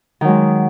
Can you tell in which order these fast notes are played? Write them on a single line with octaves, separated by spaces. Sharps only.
D#3 F#3 G#3